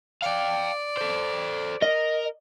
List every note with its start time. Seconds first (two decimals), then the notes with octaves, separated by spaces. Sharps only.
0.22 D5 F5 G5
0.97 A4 C5
1.82 A#4 D#5